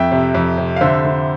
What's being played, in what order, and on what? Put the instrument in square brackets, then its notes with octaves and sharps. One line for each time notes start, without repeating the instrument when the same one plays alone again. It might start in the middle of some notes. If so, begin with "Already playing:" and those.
Already playing: [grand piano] F2 E5 G5
C3
F2
C3
F5
D3 C5 E5
D3